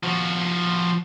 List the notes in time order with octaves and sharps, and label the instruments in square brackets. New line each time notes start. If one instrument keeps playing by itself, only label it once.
[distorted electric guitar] F3 F#4